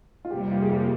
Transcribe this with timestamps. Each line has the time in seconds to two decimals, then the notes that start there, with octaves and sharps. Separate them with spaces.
0.25 F4
0.30 F2 C3 G3 A#3 G4
0.52 F4
0.62 G#4
0.71 G4